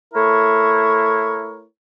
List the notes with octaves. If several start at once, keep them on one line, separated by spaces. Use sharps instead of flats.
A3 E4 A#4 C#5